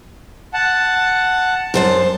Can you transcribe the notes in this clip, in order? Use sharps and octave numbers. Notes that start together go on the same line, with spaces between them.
F#5 A5
F#2 C5 A5